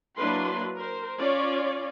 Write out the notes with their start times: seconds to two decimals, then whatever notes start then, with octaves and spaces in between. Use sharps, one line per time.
0.17 F#3 A#3 D4 E4 B4 C6
0.78 A#4 C5
1.19 C#4 F4 C#5 D5